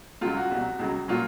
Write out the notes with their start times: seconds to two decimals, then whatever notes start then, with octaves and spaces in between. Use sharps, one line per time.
0.21 C#2 C#3 F#3 F4
0.37 F#4
0.51 C2 B2 F#3
0.79 C#2 C#3 F#3
1.08 A#2 F#3 F4